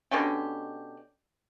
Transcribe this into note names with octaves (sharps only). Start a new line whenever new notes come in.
B2 D3 C#4 G4